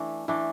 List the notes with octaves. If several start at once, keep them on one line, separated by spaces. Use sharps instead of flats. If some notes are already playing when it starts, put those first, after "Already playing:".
Already playing: E3 A3 D4
E3 A3 D4